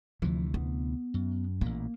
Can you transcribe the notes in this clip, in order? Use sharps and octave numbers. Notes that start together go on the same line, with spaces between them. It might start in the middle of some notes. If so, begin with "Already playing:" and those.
D2 C3 E3 F3
B3
F#2
A1 A#2 A#3